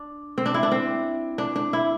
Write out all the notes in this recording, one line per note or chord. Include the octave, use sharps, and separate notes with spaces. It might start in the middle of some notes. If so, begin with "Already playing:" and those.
Already playing: D4
C4
D4
E4
D4
C4
D4
D4
E4